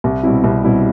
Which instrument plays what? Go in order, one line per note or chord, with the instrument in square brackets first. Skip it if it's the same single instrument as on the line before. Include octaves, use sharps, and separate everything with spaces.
[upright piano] C2
B2 G3 C4 E4
C2
B2 G3 C4 E4